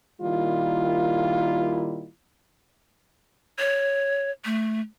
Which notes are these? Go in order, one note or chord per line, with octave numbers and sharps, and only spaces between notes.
A#2 D#3 G3 E4 F4
C#5
A3